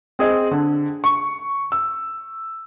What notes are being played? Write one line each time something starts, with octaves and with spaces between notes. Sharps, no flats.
C4 G#4 D#5
D3
C#6
E6